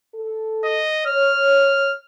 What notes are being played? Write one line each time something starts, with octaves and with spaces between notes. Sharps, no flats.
A4
D#5
C#5 F6